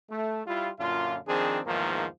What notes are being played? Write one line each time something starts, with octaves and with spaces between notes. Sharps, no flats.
A3
G3 E4 F4
F#2 A#2 D3 F4
D#3 F3 C4 D4 G#4
E2 G#2 D#3 F3 A#3